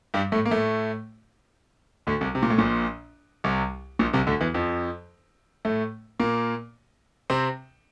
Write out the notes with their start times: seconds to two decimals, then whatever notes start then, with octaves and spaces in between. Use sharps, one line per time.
0.14 G2 G3
0.32 A2 A3
0.45 A#3
0.51 A2 A3
2.07 D2 D3
2.21 C2 C3
2.35 C3
2.43 A#2
2.50 A2
2.58 A#1 A#2
3.44 C2 C3
3.99 A#1 A#2
4.13 C2 C3
4.27 D2 D3
4.40 E2 E3
4.54 F2 F3
5.65 A2 A3
6.19 A#2 A#3
7.30 C3 C4